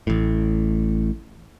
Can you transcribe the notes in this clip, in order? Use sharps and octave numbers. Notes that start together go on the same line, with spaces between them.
A1 A2